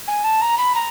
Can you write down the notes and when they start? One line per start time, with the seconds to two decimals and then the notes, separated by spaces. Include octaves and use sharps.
0.07 G#5
0.24 A5
0.41 A#5
0.57 B5
0.74 A#5